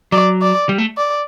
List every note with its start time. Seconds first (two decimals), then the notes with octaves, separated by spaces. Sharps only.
0.12 F#3 D5
0.42 D5
0.69 G3
0.78 A3
0.97 D5